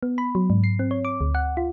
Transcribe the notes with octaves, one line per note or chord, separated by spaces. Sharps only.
B3
B5
F#3
G#2
C7
C4
C#5
D6
D2
F#5
F4